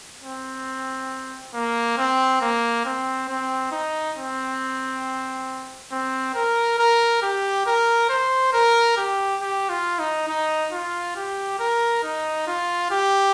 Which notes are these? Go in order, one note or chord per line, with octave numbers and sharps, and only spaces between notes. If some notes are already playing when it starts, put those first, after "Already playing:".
C4
A#3
C4
A#3
C4
C4
D#4
C4
C4
A#4
A#4
G4
A#4
C5
A#4
G4
G4
F4
D#4
D#4
F4
G4
A#4
D#4
F4
G4